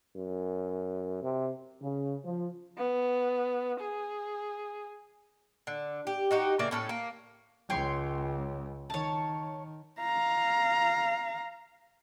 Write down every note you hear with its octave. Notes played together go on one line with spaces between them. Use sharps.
F#2
C3
C#3
F3
B3
G#4
D3
G4
D#4 F#4 G4
C#3 A#3 D5 E5
A2 C#4 A4
A#3
C#2 C#5 G5 C6
D#3 C#5 A5
F5 A#5